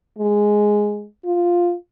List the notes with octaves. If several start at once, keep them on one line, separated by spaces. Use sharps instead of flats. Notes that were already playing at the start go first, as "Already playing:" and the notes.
G#3
F4